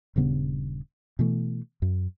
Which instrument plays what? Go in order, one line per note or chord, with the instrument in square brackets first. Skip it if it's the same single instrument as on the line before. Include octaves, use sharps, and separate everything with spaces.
[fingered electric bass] D#1 G2 C#3 B3
B2 E3 A3
F#2